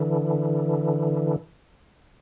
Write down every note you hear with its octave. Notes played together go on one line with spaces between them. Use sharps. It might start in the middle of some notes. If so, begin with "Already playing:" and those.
Already playing: D3 E3